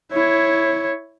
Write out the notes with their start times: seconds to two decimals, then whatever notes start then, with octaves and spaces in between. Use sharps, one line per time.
0.12 E4 C#5